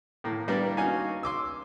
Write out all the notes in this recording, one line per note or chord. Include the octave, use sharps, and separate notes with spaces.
A2 A#3
G3 A#3 B3 D4 D5
C#4 D#4 F#4 F5 G#5
C6 D6 E6